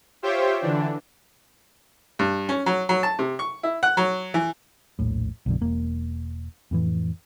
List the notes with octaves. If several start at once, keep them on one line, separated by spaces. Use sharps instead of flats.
F4 G4 C5 C#5 E5 G5
D3 E3 D4
G2
C#4
F#3
F#3
A5
C3
C#6
E4
F#5
F#3
E3
D#1 A#1 A2
B1 F#2 D3
E1 A#3
F2 A2 E3